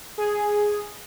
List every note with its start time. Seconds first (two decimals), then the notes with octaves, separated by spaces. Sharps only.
0.18 G#4